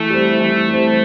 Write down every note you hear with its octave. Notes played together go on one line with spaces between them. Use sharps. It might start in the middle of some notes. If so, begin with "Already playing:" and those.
Already playing: E3 A3
G3 C4
E3
G3 C4